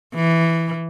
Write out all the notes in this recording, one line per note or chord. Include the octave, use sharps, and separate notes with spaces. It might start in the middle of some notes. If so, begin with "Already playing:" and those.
E3